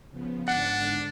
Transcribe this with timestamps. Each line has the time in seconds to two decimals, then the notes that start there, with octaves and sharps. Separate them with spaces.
0.10 C#3 F3 B3
0.48 G#2 D3 D4 F#5